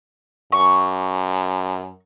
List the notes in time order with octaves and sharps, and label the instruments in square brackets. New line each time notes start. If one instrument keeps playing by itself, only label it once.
[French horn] F#2 [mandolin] C#6